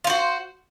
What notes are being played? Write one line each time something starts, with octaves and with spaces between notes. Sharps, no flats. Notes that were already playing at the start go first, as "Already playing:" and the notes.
F4 F#4 C5